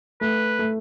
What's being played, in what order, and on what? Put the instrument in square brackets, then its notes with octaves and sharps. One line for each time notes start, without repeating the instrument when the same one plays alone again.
[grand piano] A3 [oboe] B4
[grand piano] A3